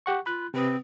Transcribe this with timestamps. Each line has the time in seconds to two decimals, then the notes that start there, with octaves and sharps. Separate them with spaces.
0.06 G4 F#5 C#6
0.26 F4 B5 F#6
0.54 C3 C4 B4 D#6